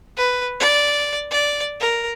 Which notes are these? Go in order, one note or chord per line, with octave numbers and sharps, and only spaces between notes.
B4
D5
D5
A#4